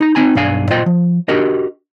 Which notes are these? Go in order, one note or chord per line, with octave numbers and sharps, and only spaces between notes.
D#4 A#5
C4 D#4 G#5 A#5
B1 G2 D4 F5 G#5
A#2 F4 C5 D#5 G5
F3
D4 F#4 G4 A#4 D#5